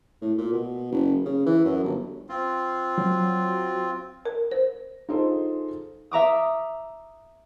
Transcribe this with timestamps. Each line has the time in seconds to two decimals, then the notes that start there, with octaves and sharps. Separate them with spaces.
0.22 A2
0.38 A#2
0.53 B2
0.91 F#1
1.25 C#3
1.46 E3
1.65 F#2
1.84 G1
2.29 C4 F4
2.98 F#3
4.26 A#4
4.52 C5
5.09 D#4 F4 G#4 A4 C5
6.11 E5 A#5 D6 D#6